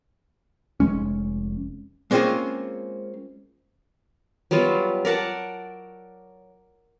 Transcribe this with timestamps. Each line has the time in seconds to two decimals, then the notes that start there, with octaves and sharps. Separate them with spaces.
0.80 F1 F#2 G#3 C#4
2.11 G#3 A#3 C4 C#4 F4 G#4
4.51 F#3 G3 B3 F4
5.05 A#4 D5 F#5 A5